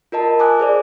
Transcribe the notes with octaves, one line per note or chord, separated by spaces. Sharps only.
F4 A#4 D#5 A5
G#5 D6 D#6 F#6
G#4 C5 D5